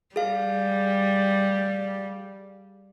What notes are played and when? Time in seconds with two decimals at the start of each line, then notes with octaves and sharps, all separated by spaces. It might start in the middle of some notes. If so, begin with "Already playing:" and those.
0.16 G3 G#4 F5